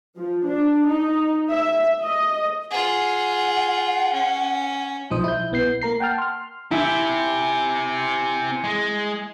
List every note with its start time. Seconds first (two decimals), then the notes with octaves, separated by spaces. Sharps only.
0.17 F3
0.47 D4
0.89 D#4
1.50 E5
2.02 D#5
2.71 F4 G#4 F#5
4.13 C#4
5.10 B1 F3 D#4 C5 D#6
5.24 E4 G6
5.52 B1 B3 G6 C7
5.82 A#3 A#4 A#5 C7
6.00 F#5 G5 A5 F6
6.18 C6 F6
6.71 C4 E4 G4 G#5
8.64 G#3